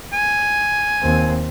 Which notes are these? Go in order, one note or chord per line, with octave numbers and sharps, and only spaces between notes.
G#5
D#2 C4